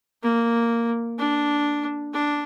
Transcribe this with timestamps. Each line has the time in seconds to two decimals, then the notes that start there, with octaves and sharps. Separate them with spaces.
0.23 A#3
1.18 D4
2.13 D4